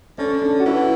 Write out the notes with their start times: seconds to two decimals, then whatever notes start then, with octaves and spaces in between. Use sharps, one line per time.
0.18 D3 C#4
0.42 D4
0.60 F#4
0.66 E3 E4